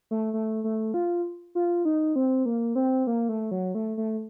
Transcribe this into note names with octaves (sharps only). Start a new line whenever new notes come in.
A3
A3
A3
F4
F4
D#4
C4
A#3
C4
A#3
A3
F#3
A3
A3